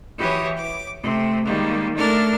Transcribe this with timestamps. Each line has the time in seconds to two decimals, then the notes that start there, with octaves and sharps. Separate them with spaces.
0.18 E3 E4 F#4 G4 C#5 D#6
0.55 D6
1.02 C3 A3 C4
1.44 D#3 G3 G#3 A#3
1.96 A3 D4 A4 A#4 F6 A6